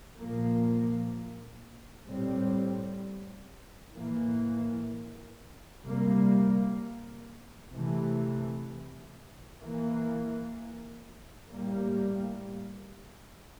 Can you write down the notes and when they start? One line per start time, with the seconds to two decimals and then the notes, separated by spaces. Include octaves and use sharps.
0.16 A#2 F3 A#3
2.05 A2 G3 C4
3.94 A2 E3 A#3
5.83 C3 G3 A#3
7.71 C3 E3 A3
9.61 E3 A#3
11.48 A2 G3 A#3